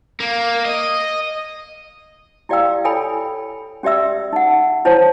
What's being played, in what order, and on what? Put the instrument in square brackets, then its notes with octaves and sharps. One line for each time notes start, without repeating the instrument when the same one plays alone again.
[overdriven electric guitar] A#3
D#5
[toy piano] E4 G4 D5 F5 G5 E6
E4 A4 C#5 G5 G#5 B5
C#4 G4 D5 E5 E6
D#4 F#5
C#4 E4 C5 C#5 A5